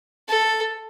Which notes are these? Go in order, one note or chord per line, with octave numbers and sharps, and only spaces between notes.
A4